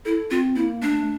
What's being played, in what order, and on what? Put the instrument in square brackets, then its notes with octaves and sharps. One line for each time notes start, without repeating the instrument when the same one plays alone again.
[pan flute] E4 [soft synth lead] A4
[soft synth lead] C4 [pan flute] F4
[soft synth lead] A#3 [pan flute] E4
[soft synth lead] A3 [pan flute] D4
[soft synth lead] A3